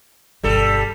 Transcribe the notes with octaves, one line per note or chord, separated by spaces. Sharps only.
G1 B2 G3 A4